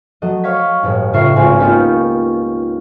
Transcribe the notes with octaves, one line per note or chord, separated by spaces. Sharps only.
F#3 A3 D#5
C#5 F5 C#6 G#6 B6
G1 A2
A2 C#3 F4 E5 C#6 C7
G#1 C#2 C4 F4 G#5
A#3 B3 C#4 D#4 F4 G4